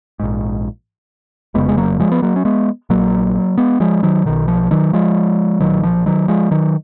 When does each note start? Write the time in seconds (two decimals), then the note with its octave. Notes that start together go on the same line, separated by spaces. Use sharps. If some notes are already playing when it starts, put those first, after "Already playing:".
0.20 A#1 G#2
1.54 F1 F2 C#3 G#3 B3
1.68 G#3
1.77 F#3 A#3
1.99 F3 G#3
2.12 B3
2.22 F#3 A#3
2.36 C#4
2.45 G#3 B3
2.90 A#1 A#2 F#3 A#3
3.58 G#3 B3
3.80 F3 G#3
4.03 D#3 F#3
4.25 B1 B2 D#3
4.48 F3
4.71 D#3 F#3
4.93 F3 G#3
5.60 B1 A#2 D#3 F#3
5.83 F3
6.06 D#3 F#3
6.28 F3 G#3
6.51 D#3 F#3